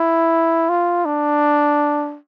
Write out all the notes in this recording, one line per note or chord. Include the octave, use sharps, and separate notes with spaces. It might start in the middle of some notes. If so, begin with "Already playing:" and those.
Already playing: E4
F4
D4